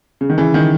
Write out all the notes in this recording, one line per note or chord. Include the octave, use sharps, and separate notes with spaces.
C#3
D#3
C#3 E3
D#3